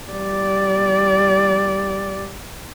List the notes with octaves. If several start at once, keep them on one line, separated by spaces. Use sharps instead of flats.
G3 D5